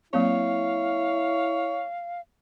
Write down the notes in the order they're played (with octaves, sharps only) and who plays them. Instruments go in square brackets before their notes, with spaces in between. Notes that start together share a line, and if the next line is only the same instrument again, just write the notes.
[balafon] F#3 A#3 C4 [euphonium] E4 [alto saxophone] C#5 [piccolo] F5